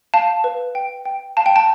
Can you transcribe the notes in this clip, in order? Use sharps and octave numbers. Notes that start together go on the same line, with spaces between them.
F5 A5
B4
G5
G5
F5 A5
G5
A5